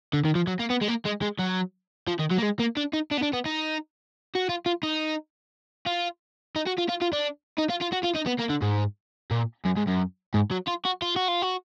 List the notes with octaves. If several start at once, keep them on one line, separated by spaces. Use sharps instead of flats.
D3
D#3
F3
F#3
A#3
B3
G#3
A#3
G#3
G#3
F#3
F3
D#3
F#3
A#3
G#3
A#3
D4
D#4
D4
B3
D4
B3
D#4
F#4
F4
F4
D#4
F4
D#4
F#4
F4
F4
F4
D4
D#4
F4
F4
F#4
F4
D#4
B3
A#3
D3
G#2
A#2
F#2
G#2
F#2
G#2
F#3
F4
F#4
F4
F#4
F4
F#4